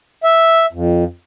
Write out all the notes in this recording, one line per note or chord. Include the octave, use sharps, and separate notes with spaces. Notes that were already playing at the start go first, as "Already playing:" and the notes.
E5
F2